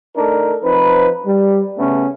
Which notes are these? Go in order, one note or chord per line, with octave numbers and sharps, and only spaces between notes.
A3 D4 D#4 A4 A#4
F3 C4 D#4 B4
G3
C#3 A3 B3 C#4